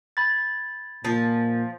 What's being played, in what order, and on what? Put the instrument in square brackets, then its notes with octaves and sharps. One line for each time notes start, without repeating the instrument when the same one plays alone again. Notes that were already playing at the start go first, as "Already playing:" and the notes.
[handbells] B5 G#6 A6
[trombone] A#2 [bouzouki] F3